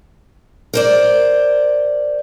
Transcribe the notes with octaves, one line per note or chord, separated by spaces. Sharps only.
A#4 C5 D5